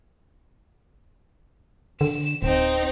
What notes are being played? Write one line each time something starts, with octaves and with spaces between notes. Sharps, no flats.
D3 E7
D1 C4 D#4